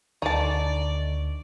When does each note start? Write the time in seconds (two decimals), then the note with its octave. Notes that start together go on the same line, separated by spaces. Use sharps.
0.22 D2 D3 D#4 D5 A5 C#6